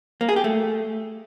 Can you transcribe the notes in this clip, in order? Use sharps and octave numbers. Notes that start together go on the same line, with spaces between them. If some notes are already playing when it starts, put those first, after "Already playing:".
A#3
G#4
G4
A3